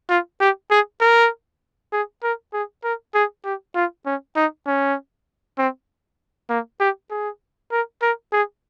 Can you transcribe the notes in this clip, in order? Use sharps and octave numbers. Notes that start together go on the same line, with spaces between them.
F4
G4
G#4
A#4
G#4
A#4
G#4
A#4
G#4
G4
F4
C#4
D#4
C#4
C4
A#3
G4
G#4
A#4
A#4
G#4